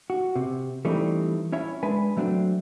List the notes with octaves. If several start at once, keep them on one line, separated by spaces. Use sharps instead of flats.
F#4
C3
E3 G3 A3 C4 D4 D#4
C#4 E4 C#5 E5
G#3 D4 B4 G#5
F#3 A3 C4 D4